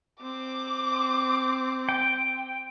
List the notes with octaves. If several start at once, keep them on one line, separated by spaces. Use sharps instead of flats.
C4 D6
G5